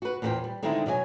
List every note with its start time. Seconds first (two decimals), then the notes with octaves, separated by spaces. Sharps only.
0.02 F#4 B4
0.22 E2 A#2 C#4 F#4 C5 G5
0.44 G3
0.63 D3 D#3 G#3 C4 D#4 E4
0.86 B2 F#3 D5 G#5